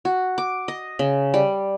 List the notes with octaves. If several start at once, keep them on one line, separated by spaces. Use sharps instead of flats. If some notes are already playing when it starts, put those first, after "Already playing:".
F#4
D6
D#5
C#3
G3